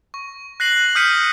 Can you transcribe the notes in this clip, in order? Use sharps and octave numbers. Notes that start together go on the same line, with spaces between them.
C#6
F#6 A#6 C7 F#7
D#6 F6 G6 B6 C#7 D#7